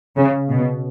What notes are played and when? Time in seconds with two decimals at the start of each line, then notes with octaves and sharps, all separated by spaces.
0.16 C#3
0.50 B2